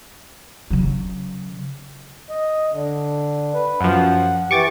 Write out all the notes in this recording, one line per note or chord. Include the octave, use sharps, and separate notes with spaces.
C#3 F#3
D#5
D3
B4
F#2 F3 F#5
E3 G4 C#6 D6 A6